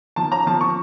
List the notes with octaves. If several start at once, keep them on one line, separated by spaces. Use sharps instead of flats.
F3 A5
C#4 A#5
F3 A5
F3 C#6